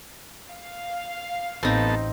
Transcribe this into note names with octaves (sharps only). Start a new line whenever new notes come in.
F5
A1 B3 C4 D#4 A4 A5